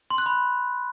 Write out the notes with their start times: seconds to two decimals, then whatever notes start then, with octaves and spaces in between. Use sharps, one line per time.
0.10 C6
0.18 F#6
0.26 B5